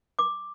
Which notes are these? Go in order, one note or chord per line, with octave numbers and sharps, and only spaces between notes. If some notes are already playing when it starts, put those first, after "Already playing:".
D6